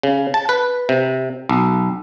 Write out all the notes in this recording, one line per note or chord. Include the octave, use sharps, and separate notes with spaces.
C#3
A5
B4
C3
B1